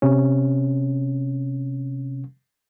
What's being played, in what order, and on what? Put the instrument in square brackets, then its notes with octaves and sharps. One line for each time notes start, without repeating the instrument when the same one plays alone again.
[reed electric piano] C3 C#4